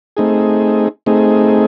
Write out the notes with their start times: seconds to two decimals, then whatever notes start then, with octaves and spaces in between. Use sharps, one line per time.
0.17 A3 C4 D#4 G#4
1.06 A3 C4 D#4 G#4